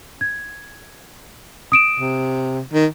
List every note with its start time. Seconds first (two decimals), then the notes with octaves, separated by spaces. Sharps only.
0.21 G#6
1.72 D#6 D7 E7
1.99 C3
2.73 D#3